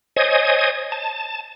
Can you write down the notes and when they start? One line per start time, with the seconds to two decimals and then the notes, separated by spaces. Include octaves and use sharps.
0.16 C5 C#5 D#5 G#5 D#6
0.92 A5